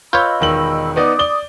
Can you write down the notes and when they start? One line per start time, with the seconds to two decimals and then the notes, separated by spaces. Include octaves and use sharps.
0.13 F4 B4 C#5 D#5 B5 E6 G6
0.40 E1 D#3 F#7
0.96 B3 D#4 D5 D6 D#6
1.19 D5 G7